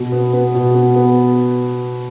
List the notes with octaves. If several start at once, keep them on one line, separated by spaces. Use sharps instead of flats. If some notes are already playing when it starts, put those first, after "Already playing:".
Already playing: B2
B3
B3
B2
B3
B3